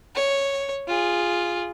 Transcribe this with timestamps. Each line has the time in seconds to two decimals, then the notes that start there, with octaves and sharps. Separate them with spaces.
0.15 C#5
0.87 F4 G#4